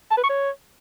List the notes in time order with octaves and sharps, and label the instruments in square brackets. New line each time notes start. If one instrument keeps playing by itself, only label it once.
[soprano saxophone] A5
B4
C#6
C#5